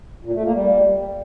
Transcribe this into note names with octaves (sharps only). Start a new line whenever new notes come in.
A#2
A3
A#3
G3